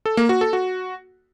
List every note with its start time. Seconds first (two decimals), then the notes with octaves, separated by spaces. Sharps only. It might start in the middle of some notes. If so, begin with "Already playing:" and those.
0.06 A4
0.17 A#3
0.29 F#4
0.41 A4
0.53 F#4